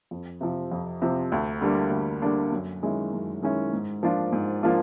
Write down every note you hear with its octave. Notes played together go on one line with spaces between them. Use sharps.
F2
C3 F3
F2
C3 F3
D2
D3 G3 A#3 D4
D2
D3 G3 A#3 D4
F#2
D#3 G#3 C#4 E4
F#2
D#3 G#3 C#4 E4
G#2
F3 A#3 D4 F4
G#2
F3 A#3 D4 F4